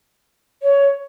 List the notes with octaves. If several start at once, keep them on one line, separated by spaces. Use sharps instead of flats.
C#5